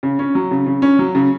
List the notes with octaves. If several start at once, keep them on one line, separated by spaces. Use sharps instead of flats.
C#3
C#4
F#3
C#3
C#3
C#4
F#3
C#3